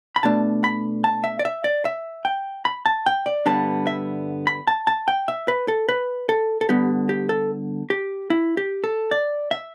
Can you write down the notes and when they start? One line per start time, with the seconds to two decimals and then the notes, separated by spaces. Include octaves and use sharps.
0.16 B5
0.23 B2 A3 D4 A5
0.64 B5
1.04 A5
1.24 E5
1.39 D5
1.45 E5
1.64 D5
1.85 E5
2.25 G5
2.65 B5
2.86 A5
3.06 G5
3.26 D5
3.46 G2 D3 G3 B3 D4 A5
3.87 E5
4.47 B5
4.67 A5
4.87 A5
5.08 G5
5.28 E5
5.48 B4
5.68 A4
5.89 B4
6.29 A4
6.61 A4
6.69 D3 G3 B3 G4
7.09 G4
7.29 A4
7.90 G4
8.30 E4
8.57 G4
8.84 A4
9.11 D5
9.51 E5